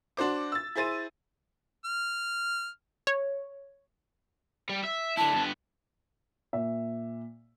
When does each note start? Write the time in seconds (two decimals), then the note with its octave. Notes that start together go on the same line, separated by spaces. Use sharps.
0.17 D4 F#4 C5 D6
0.52 E6 A6
0.75 E4 G#4 C5 A6 D#7
1.85 F6
3.07 C#5
4.69 G3
4.84 E5
5.17 D3 E4 A5
5.32 G2 B3
6.53 A#2 E5